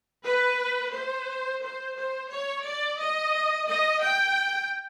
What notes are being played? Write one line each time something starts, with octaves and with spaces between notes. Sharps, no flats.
B4
C5
C5
C5
C#5
D5
D#5
D#5
G5